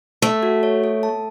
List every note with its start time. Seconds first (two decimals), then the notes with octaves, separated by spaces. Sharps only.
0.22 A3 A5
0.43 F#4
0.63 C#5
0.84 A4
1.03 A5